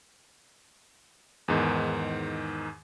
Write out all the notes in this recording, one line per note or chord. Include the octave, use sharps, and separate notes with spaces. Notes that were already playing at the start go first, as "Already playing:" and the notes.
E2 G#2 D#3